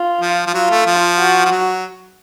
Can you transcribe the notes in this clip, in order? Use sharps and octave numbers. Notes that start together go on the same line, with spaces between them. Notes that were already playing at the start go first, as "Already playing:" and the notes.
Already playing: F4
F3
F3
F#3 F4
A3
F3
F#4
F3
F#3